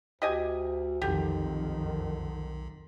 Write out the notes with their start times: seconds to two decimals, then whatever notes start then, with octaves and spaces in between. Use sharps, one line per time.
0.22 D2 G4 D#5 G#5
1.02 B1 F2 D3 D#3 G4